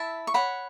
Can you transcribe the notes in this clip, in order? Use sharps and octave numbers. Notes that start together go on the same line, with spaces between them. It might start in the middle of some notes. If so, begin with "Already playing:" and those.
Already playing: E4 E5 A5
C#6
C#5 F#5 B5